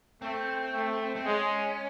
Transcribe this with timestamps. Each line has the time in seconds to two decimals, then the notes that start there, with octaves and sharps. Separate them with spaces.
0.22 A3 C4
0.74 A3
1.16 C4
1.25 G#3 C#4